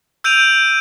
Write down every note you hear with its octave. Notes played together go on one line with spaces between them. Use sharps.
E6 G6 D7 D#7 F7